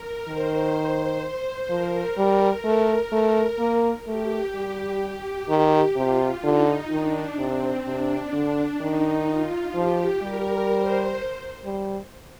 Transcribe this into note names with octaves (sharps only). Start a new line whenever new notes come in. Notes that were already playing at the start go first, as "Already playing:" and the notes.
Already playing: A#4
D#3 C5
F3 A#4
G3 A#4
A3
A3
A#3
A3 G4
G3
G4
D#3
C3 F4
D3 D#4
D#3 D4
C3 C4
C3 D4
D3
D#3 D#4
F4
F3 G4
G3 A#4
C5
G3